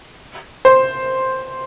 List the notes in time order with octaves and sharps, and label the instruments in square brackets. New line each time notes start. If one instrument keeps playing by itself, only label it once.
[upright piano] C5